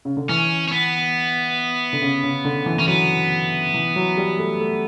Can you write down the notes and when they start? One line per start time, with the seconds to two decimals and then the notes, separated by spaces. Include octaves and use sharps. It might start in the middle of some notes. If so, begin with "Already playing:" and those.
0.05 C#3
0.17 D3
0.29 E3 C#4
0.68 C#4
0.72 B3
1.93 D3
2.02 C#3
2.23 C#3
2.45 D3
2.66 E3
2.78 E3 C#4
2.88 F#3 B3
3.74 E3
3.96 F#3
4.17 G3
4.39 A3
4.60 A3